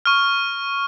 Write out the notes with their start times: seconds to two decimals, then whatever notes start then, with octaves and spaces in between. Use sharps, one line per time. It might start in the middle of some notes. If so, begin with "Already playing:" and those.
0.05 C#6 F6